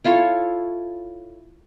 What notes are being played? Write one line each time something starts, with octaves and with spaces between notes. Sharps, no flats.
E4 F4 A4 C#5